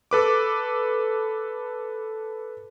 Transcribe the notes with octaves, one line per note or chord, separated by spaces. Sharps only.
A4 B4 D6